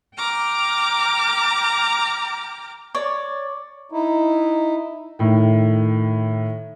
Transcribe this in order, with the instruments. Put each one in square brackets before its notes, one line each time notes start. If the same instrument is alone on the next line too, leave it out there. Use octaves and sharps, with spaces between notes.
[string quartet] G5 A#5 D6 F6
[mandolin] C#5 D5
[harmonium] D#4 E4
[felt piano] A2 D#3